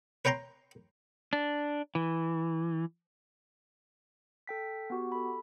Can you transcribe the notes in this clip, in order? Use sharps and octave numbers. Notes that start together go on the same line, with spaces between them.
B4 C#5 G5 A#5 C6
D4
E3
A4 G5 B6
B3 F#4 G4
A4 B5